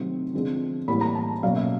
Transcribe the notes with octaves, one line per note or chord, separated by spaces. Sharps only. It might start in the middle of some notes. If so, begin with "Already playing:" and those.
Already playing: C3 D#3 F#3 A3 C4
D3 F3 G#3 C4
A2 E3 G3 A#3 B5
A#5
A5
B2 F#3 A#3 C#4 F5
E5